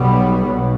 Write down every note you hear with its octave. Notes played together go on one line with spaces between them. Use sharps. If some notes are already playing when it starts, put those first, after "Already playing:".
Already playing: B1 B2 G3 B3
B1 B2